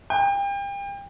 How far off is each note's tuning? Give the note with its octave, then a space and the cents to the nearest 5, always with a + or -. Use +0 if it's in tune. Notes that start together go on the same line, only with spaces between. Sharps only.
G5 +35